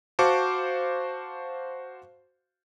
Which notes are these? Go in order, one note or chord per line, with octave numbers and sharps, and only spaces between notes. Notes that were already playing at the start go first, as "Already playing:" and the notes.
F#4 C5 F5 A5 C#6 D6